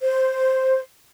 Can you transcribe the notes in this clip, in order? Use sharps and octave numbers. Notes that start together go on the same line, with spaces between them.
C5